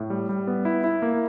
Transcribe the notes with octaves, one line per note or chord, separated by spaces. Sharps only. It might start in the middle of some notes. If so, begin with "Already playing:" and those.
Already playing: A2
G3
G3
B3
E4
E4
A#3